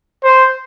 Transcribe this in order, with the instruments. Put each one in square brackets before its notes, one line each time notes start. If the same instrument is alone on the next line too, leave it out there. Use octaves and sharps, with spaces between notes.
[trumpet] C5